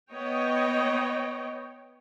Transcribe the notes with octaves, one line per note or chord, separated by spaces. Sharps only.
B3 C#5 D#5 G5